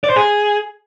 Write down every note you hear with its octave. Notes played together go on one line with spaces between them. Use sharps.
D5
C5
G#4